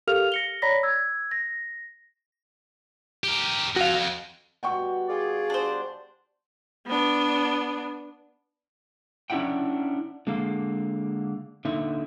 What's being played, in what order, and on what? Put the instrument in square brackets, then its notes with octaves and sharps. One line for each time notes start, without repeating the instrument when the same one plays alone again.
[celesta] G4 A4 A#4 F5 F6 F7
A#6 C#7 G7
C#5 D5 A#5 B5 A#6 B6
E6 G#6
A#6
[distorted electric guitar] G4 A#4
[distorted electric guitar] F2 [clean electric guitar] F#4 F5
[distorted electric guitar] F2
[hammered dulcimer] B2 G3 [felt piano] F#5 G5 C#6
[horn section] F4 G#4 D5
[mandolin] D4 C5
[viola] B3 D4
[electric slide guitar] C#4 D4 E4 E5 F#5 G5
D3 G#3 A#3 F5
D3 A#3 D#4 E5